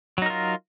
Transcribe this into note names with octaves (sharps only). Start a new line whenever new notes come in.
F#3 D#4 F4 A#4